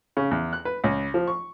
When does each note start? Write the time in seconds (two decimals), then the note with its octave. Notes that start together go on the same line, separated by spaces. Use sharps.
0.17 C#3
0.31 E2
0.53 F#6
0.65 B4
0.84 C#2
1.14 F3
1.28 C#6